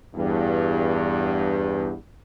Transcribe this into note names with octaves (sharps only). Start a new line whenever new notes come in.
E2 G2